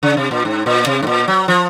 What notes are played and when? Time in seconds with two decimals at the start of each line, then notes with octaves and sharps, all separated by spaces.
0.03 C#3
0.17 C3
0.31 A#2
0.45 G#2
0.66 A#2
0.86 C3
1.03 G#2
1.07 A#2
1.28 F#3
1.48 F3